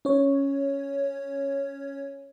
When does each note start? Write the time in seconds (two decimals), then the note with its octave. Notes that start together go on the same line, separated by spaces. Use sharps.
0.05 C#4 C#5